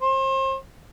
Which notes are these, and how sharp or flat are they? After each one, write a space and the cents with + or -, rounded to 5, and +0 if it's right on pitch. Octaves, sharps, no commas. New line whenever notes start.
C5 +35